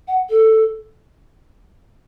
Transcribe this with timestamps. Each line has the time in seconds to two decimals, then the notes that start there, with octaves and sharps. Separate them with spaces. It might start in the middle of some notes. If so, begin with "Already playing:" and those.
0.08 F#5
0.30 A4